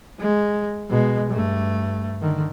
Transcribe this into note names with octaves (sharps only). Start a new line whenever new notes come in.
G#3
B2 G#3
G2 A3
D3 D#3